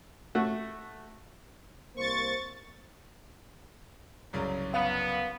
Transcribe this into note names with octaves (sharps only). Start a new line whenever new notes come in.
A3 F#4
C2 A#3 C5 C#6 A6
C2 F#2 C#3
B3 F5